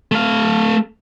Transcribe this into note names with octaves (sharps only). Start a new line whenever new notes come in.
A3 F5